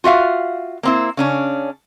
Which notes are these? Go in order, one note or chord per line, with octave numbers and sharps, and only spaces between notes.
F4 F#4 E5 F5
A#3 C4 E4
C#3 C#4 D4